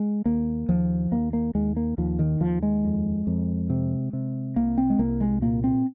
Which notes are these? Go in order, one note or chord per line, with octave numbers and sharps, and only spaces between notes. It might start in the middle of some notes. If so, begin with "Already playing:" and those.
Already playing: G#3
D#2 A#3
D#2 F3
D#2 A#3
A#3
D#2 G#3
A#3
D#2 F3
D#3
D#2 F3
G#3
F2
F2
C3
C3
C2 A#3
C4
G#3
C2 A#3
G#3
A#2 A#3
C4